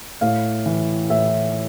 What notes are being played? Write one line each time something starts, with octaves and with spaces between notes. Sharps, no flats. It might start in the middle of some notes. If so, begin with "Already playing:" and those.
A2 F5
E3
A2 E5